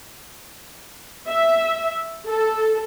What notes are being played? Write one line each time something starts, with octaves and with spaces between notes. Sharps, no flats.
E5
A4